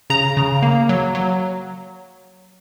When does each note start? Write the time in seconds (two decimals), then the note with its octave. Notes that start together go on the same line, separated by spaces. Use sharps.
0.10 C#3 A#5
0.37 C#3
0.62 A#3
0.89 F#3
1.15 F#3